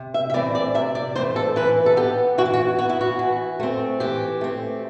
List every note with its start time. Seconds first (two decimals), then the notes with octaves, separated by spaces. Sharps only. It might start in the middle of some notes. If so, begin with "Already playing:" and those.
Already playing: C3
0.14 E5
0.30 E5
0.34 E3 A3 C4 D5
0.55 D5
0.74 C3 E5
0.95 D5
1.16 E3 A3 C4 C5
1.36 A4
1.56 E3 B4
1.86 A4
1.97 B3 G4
2.38 E3 F#4
2.46 E4
2.54 F#4
2.78 B3 F#4
2.89 E4
3.01 F#4
3.19 E3
3.60 A3 C4
4.00 E3 G4
4.41 A3 C4